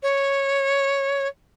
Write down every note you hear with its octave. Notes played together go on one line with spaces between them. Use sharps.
C#5